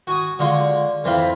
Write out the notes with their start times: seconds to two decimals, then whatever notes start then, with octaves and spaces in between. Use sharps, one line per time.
0.07 F#4 G#5 D#6
0.39 D3 G#3 F4 C#6
1.04 F2 E3 C4 F4 B5